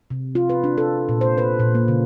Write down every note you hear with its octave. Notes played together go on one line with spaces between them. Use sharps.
C3
F4
B4
D4
A4
A#2
C5
B4
A#2
A#3
C#3